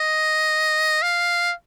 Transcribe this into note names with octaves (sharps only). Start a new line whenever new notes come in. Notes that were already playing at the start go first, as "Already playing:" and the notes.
Already playing: D#5
F5